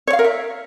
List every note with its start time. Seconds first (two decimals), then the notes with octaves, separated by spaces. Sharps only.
0.07 C#5
0.13 F5
0.19 A#4
0.24 E5